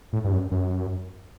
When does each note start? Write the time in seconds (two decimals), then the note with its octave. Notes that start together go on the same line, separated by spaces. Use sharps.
0.13 A2
0.24 G2
0.32 F#2
0.51 F#2